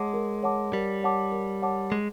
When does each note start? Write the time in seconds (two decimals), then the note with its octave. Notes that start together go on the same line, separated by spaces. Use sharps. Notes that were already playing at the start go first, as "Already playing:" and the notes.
Already playing: G#3 C#5 F#5 A5 D6
0.14 A#4
0.43 C#5 F#5 A5 D6
0.73 G3 A#4
1.03 C#5 F#5 A5 D6
1.32 A#4
1.62 C#5 F#5 A5 D6
1.92 G#3 G#4